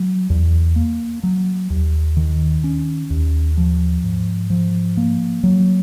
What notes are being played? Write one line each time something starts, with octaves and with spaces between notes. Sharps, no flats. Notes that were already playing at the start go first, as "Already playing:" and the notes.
Already playing: F#3
E2
A#3
F#3
D#2
D#3
C#4
D#2
F3
G#2
F3
A#3
F#3